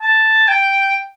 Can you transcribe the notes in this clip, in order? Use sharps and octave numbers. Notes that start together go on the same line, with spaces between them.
A5
G5